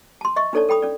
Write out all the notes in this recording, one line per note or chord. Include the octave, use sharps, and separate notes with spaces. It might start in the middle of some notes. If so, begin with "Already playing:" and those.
A5 C6
D#5 E5 C#6
D4 D#4 A4 C#5 D5 A5
A4 G5 B5 D#6
C#4 D5